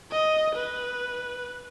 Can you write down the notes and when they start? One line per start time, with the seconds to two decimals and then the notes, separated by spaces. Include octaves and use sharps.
0.11 D#5
0.55 B4